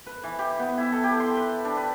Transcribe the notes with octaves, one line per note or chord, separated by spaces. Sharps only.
B4
E3
G4
B3
E4
A4
G4
C6
B4
D4
B4